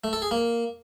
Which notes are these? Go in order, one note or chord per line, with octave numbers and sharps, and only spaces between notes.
A3
A4
G#4
A#3